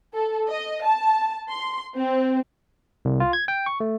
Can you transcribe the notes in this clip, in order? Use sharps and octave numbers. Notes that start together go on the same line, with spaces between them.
A4
D#5
A5
C6
C4
C2
F4
G#6
G5
C#6
A3